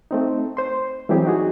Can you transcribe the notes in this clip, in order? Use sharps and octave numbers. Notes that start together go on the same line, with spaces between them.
A3 C4 D#4
C5 C6
E3 F#3 G3 C4 G4 G#4
D#4 F#4 G#4